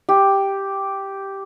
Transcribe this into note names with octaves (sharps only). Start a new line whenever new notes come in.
G4